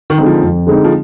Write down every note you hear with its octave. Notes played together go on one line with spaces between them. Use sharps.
D#3
D3 G#3 C4 D#4
F3
F2
D3 G#3 C4 D#4
F3